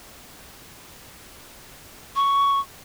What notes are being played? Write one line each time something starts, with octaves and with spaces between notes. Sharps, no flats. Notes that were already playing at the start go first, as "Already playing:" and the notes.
C#6